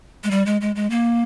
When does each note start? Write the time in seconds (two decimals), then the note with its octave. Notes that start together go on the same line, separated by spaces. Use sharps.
0.24 G#3
0.31 G3
0.46 G#3
0.61 G#3
0.76 G#3
0.90 A#3